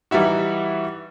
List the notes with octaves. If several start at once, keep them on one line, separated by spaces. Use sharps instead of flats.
E3 G3 D#4 E4 F#4